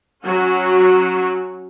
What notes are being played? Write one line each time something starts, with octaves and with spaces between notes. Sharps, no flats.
F#3 C#4 F#4